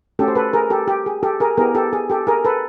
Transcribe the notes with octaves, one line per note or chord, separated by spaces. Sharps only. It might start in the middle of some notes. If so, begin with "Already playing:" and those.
A3 C#4 F#4 G4 A4
C5
A4 B4
G#4 A#4
G4 A4
G4
G#4
G4 A4
G#4 A#4
B3 E4 G4 G#4 A#4
G4 A4
G#4
G4 A4
G#4 A#4
A4 B4